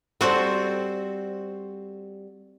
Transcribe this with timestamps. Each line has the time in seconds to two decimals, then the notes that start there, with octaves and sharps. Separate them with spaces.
0.21 G3 C4 F#4 A4 C5